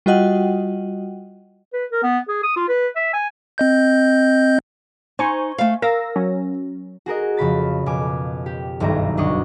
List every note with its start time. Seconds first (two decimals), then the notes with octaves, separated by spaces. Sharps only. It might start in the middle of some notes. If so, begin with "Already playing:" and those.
0.06 G3 F4 F#4 D#5 F#5 G5
1.73 B4
1.92 A#4
2.03 B3
2.29 G#4
2.43 D#6
2.56 F4
2.68 B4
2.96 E5
3.13 G#5
3.58 C4 D#5 G6
5.19 D#4 C5 G#5 C#6
5.58 A3 F5
5.82 A#4 F5 E6 A#6
6.16 F#3 C#4
7.06 F#4 G#4 A#4 D#5
7.37 F2 C#3 B5 A6
7.86 F2 B2 G#5 D6
8.46 G4
8.80 F#1 B1 G2 D#3 E5 A#5
9.17 D2 D4 D#5 C#6